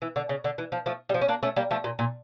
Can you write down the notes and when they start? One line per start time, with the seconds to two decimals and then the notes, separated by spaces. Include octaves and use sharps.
0.02 E3
0.16 D3
0.29 C#3
0.44 D3
0.58 E3
0.72 F3
0.86 F3 A3
1.09 G3
1.14 F3
1.21 C#4
1.28 A#3 D4
1.43 A3 C#4
1.56 G3 A#3
1.71 F3 A3
1.84 A#2
1.99 A#2